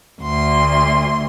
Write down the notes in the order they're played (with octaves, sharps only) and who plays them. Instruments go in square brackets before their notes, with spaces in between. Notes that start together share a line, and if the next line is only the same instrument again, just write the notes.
[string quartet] D2 C6